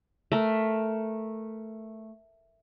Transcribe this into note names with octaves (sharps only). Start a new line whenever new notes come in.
A3 A#4